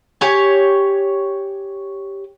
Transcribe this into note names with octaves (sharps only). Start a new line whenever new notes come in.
G4 C#5 G#5